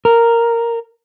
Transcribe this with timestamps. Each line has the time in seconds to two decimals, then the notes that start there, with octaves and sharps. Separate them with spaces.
0.05 A#4